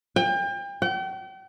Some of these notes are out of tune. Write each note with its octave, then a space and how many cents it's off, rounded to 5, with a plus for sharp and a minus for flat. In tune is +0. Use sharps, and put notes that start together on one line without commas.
G5 +35
G5 -40